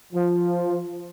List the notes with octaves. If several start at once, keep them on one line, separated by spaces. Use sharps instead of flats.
F3